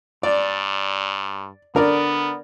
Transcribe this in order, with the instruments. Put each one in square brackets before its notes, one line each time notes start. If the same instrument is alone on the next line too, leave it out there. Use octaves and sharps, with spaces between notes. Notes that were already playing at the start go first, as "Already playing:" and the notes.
[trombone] G2 [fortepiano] D5
[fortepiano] D3 A#4 D5 [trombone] B3